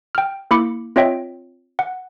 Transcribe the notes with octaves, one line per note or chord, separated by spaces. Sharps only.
G5 F6
A#3 E4 B5 D6 C#7
C4 F4 C#5 D#5 E5 G5
F#5